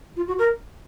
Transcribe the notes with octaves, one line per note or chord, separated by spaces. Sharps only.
F4
F#4
A#4